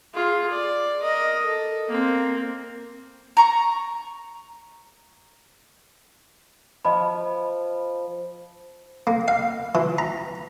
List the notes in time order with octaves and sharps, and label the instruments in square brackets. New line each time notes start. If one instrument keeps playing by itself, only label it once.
[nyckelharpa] F4 G#4
D5
A#4 D#5
A4
A#3 C4
[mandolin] A#5 C#6
[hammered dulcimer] F3 [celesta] D#5 B5
[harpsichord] A#3
F5
E3
A#5